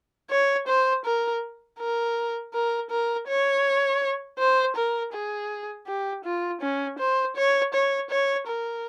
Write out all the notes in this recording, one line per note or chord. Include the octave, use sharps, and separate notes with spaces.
C#5
C5
A#4
A#4
A#4
A#4
C#5
C5
A#4
G#4
G4
F4
C#4
C5
C#5
C#5
C#5
A#4